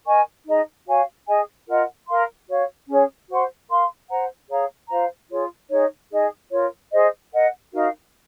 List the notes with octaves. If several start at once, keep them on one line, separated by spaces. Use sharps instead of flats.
A#4 D#5 G#5 C#6
D#4 G#4 D#5 A#5
F#4 C#5 F5 G#5
G#4 D#5 G#5
F4 A#4 D#5 F#5
A#4 F5 C6
F#4 C#5 F5
C#4 G#4 C#5
F#4 C5 F#5 C6
A#4 F5 C6
C5 F#5 A#5
G#4 C#5 F5 A#5
F4 C5 F5 A#5
F4 G#4 C#5
D#4 G#4 C#5
D#4 G#4 D#5
F4 A#4 C#5
G#4 C5 D#5
A#4 D#5 F#5
D#4 F#4 A#4 F5